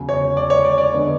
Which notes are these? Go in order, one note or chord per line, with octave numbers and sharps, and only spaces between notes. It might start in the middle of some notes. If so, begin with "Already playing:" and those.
Already playing: E2 C#3 F#3
C#5
D5
C#5
D5
D5
D3 G#3 B3 D4